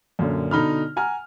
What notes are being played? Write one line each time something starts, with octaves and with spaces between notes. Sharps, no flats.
F#2 A#2 D3
B2 D3 D#4 B5 F6
F#5 G#5 A#5 F6